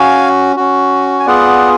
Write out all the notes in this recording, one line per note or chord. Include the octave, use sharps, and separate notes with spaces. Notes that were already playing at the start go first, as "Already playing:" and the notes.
Already playing: C#4 F#4 F5 G#5
C#4 F#4
G#5
B3 F4 G#4 D5 F#5